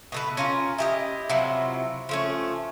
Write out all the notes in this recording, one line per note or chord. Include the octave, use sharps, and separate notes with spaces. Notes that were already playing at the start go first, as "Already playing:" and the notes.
B2 A3 B4
C#4 F4 A#4
E4 G4 D#5
C3 F3 F#3 E4
F3 A3 C#4